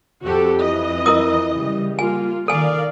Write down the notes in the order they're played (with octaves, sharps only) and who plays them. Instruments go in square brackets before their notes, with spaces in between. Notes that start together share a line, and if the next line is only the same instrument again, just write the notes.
[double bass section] F2 [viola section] F#4 G4 A4
[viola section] E3 D#5
[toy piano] E4 A#4 D#6
[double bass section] C#3 G3
[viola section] A#3 F4 [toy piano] G#5
[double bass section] D#3 [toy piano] A4 G#5 [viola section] A#4 D5 F5